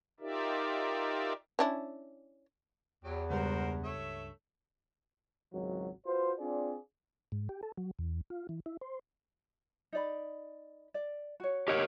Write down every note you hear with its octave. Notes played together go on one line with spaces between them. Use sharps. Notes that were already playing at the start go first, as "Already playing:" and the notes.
D#4 F4 G4 A#4 D5 E5
C#4 D4 E4
E2 F#3 G4
C#2 G2 F#4 A#4 C5
A3 C#5 E5
G#1 C#2 F#3
F4 F#4 B4 C5
C4 D4 F4 G#4 D5
G#2
G4
A4
F#3
E2
F4
E3
E4
C5
D#4 D5 B5
D5
F#4 C#5
G4 A#4 C#5 D#5 F#5